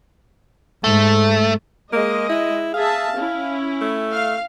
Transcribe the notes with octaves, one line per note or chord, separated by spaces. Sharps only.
G#2 A3
G#3 A#3 D#5
E4
G#4 E5 F5 A5
C#4 E4
A3
F5